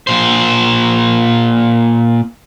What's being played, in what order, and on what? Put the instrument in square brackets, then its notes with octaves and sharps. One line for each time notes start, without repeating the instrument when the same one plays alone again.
[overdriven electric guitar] A#2 C5